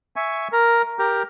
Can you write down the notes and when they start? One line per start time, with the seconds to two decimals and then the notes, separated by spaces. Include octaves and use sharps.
0.16 E5 G#5 C#6
0.52 A#4
0.99 G4 A#4